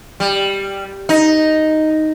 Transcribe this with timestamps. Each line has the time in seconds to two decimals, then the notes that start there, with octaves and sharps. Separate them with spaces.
0.20 G3
1.09 D#4